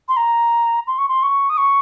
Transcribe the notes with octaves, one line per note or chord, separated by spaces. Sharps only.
C6
A#5
C6
C#6
C6
C#6
D#6
C#6